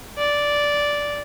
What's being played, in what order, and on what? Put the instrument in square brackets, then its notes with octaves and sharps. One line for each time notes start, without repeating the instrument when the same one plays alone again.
[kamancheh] D5